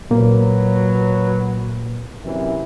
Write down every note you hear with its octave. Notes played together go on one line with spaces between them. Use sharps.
A#2 F#3 A#3 B4
F#2 C3 E3